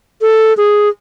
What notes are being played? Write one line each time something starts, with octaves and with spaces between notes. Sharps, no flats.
A4
G#4